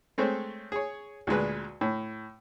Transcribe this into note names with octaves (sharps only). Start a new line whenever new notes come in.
G#3 A3 C4 C5 C#5
G#4 C#5
D2 A#2 G#3 B4
A2